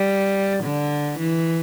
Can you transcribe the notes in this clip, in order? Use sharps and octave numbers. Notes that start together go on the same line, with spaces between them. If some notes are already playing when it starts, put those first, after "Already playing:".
Already playing: G3
D3
E3